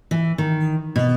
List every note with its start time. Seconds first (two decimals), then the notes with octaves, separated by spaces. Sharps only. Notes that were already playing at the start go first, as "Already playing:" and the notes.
0.11 E3
0.38 D#3
0.96 B2